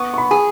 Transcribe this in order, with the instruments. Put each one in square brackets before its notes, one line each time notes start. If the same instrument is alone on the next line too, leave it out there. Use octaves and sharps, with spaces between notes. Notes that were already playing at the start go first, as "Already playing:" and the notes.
Already playing: [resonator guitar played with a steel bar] B3 [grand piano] C#6
[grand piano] C#6
B5
[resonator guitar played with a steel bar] G#4